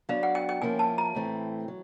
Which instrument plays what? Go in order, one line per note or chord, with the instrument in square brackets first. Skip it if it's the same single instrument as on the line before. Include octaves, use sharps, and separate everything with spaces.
[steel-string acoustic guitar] F#3 B3 D4 [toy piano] F5
[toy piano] F#5
G5
G5
[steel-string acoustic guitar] F3 A#3 C#4 E4 [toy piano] G#5
[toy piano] A5
A#5
[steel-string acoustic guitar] A2 E3 A3 C4
F#3